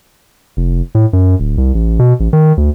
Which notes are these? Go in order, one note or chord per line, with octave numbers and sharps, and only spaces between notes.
F1
A2
F#2
D1
C2
A1
B2
A1
D#3
D2